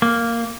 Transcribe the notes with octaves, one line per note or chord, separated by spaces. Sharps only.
A#3